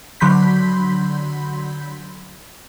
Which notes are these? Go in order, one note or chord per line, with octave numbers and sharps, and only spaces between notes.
D3 F#3 B5 C6 G6 B6